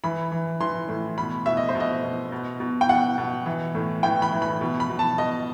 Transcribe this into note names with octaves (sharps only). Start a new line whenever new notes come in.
E3 B5
E3
E3 C6
A2
B2 B5
B2 E5
D#5
C5
B2
D#5
B2
B2
B2
G5
B2 F#5
B2
E3
A2
E3 G5
B5
E3
B5
B2
B5
B2
A5
B2 D#5